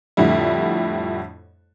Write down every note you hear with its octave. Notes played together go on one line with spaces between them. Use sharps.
F2 A2 D3 G3 E4